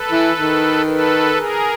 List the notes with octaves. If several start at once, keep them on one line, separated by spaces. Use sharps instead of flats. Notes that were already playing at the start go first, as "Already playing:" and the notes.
Already playing: A4 B4
E3
D#3
A4 B4
G#4 A#4